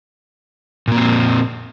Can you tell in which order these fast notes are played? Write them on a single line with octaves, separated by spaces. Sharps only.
A#2 A#3 C4